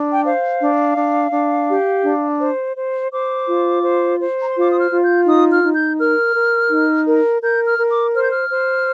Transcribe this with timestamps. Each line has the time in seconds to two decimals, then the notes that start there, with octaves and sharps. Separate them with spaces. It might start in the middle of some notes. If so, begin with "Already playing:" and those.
Already playing: D4
0.13 G5
0.24 C5 F5
0.61 D4
0.96 D4
1.32 D4
1.68 G4
2.04 D4
2.40 C5
2.76 C5
3.11 C5 D6
3.48 F4
3.83 C5
4.20 C5
4.41 A#5
4.50 C6
4.56 F4 D6
4.70 D#6
4.80 F6
4.91 F4
5.04 G6
5.26 D#4 D#6
5.50 F6
5.63 D#4
5.74 G6
5.98 A#4 F6
6.35 A#4
6.70 D#4
7.07 A#4
7.42 A#4 G6
7.66 F6
7.78 A#4
7.90 D6
8.14 C5 F6
8.22 G6
8.30 F6
8.50 C5